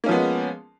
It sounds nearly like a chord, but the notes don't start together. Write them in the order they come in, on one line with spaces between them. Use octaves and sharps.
A#3 C#4 F3 B3 G#3